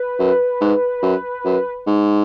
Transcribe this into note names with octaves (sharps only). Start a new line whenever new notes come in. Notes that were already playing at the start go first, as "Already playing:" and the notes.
Already playing: B4
F#2
G#2
F#2
F#2
G#2